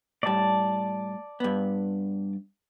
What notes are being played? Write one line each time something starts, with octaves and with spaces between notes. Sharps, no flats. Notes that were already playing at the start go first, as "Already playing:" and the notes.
A2 G3 D5 A5
G2 B3